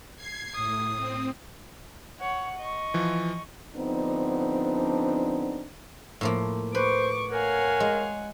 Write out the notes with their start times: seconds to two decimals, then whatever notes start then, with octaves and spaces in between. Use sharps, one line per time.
0.16 G#6 C7
0.55 A2 D#6
0.95 C4
2.20 C#5 F#5
2.58 D#5 C#6
2.94 E3 F3
3.76 D3 F3 B3 C4 D4 D#4
6.21 A2 F3 A#3
6.75 B4 C5 C#6 D6
7.31 A#4 C#5 F5 F#5 G#5
7.80 G#3